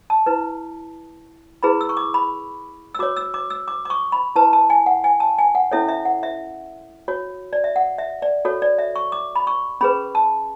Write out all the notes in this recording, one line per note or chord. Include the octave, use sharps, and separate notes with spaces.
A5
E4 B4
E4 G#4 B4 B5
E6
C#6
D6
B5
E6
F#4 C#5 D6
E6
D6
E6
D6
D6
C#6
B5
E4 B4 A5
A5
G#5
F#5
G#5
A5
G#5
F#5
C#4 E4 A4 C#5 E5
E5
F#5
E5
F#4 C#5
D5
E5
F#5
E5
D5
F#4 A4 C#5
D5
E5
C#6
D6
B5
C#6
C#4 G#4 B4 B5
A5